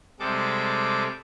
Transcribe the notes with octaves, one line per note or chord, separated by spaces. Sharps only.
C3 G3 G#3 A4 D6